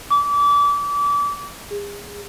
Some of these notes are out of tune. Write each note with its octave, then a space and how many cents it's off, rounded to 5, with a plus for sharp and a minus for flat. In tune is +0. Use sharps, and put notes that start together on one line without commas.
D6 -30
G#4 -30